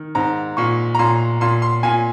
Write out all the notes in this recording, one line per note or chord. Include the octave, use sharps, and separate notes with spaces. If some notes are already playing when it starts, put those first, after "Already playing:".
Already playing: D#3
G#2 A#5
A#2 C#6
A#5
A#2 C6
A#2 C6
C6
A#2 G#5